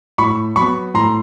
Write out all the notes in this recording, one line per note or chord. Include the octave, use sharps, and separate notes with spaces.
A2 B5 C#6
F#3 B3 B5 C#6
A2 A#5 C6